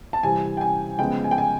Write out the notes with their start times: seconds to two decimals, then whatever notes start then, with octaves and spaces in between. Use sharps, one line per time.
0.13 A5
0.23 C3 E3 G3 C4 G#5
0.57 G5
0.61 G#5
0.99 C#3 F3 G#3 B3 G5
1.24 G#5
1.31 G5
1.38 G#5